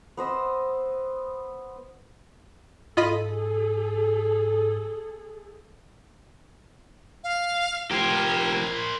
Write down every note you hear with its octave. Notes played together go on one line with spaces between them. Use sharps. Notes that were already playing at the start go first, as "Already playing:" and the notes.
B3 C5 D#5 E6
G#2 F4 G#4 A4 D#5 B5
F5
F3 G4 A#4 C5 G#6